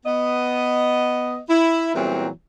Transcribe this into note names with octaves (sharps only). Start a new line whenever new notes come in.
B3 D#5
E4
E2 A#2 E3 F#3 G3 C4